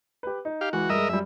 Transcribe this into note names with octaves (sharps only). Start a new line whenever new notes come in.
G4 B4
D#4
G4 F5
C#2 E3 F#4
G2 G#3 A#4 D#5 E5
F#2 G3 E5